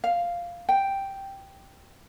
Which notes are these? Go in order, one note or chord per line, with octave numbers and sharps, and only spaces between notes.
F5
G5